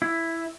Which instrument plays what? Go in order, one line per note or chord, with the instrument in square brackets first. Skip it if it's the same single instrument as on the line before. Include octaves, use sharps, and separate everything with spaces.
[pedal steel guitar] E4